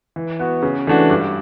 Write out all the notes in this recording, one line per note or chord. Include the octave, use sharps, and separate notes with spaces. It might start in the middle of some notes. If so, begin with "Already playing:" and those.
E3
B3 F#4
C#3
E3 A3 D4 F#4
G2